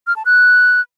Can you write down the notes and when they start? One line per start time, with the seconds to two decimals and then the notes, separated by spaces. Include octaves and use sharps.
0.07 F6
0.16 A5
0.26 F#6